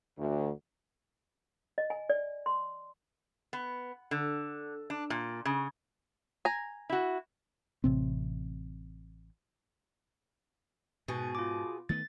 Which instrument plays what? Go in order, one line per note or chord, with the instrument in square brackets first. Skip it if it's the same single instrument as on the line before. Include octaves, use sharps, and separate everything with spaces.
[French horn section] D2
[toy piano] D#5
G#5
D5
C6
[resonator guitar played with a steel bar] B3
D3
D4
A#2
C#3
[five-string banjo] G#5 A#5
[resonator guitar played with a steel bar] E4 F#4
[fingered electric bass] A1 C3 C4
[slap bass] G#2 [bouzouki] B2 G#4
[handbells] F4 D6
[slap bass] D#3 A3 B3 [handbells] A6